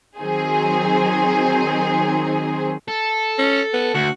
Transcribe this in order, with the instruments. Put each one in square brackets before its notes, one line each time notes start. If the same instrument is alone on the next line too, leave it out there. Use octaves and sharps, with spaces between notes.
[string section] D#3 F#3 C4 D#4 G#4 C5
[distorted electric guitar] A4
[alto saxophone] C#4
B3
[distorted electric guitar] D2 [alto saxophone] F#4